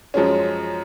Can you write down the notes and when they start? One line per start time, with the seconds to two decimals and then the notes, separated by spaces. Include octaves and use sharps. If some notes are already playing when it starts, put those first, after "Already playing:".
0.14 F#2 F3 G#3 C#4